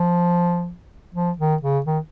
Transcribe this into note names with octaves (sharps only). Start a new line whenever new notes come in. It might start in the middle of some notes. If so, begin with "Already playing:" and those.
Already playing: F3
F3
D#3
C#3
D#3